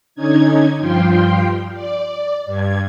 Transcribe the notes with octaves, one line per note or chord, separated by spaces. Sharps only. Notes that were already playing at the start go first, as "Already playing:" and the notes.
D3 C#4 D#4 G#6
G2 F3 F4 G5 C6
D5
G2 G#6